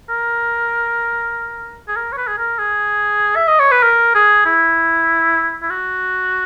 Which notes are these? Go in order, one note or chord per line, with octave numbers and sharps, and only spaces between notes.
A#4
G#4
A#4
C#5
B4
G#4
A#4
G#4
E5
D#5
C#5
B4
A#4
G#4
E4
E4
F#4